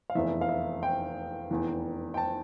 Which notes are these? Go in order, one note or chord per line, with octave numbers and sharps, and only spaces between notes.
F5
F1 E2 E3 E5
F5
E5
G5
F1 E2 E3
G5
A5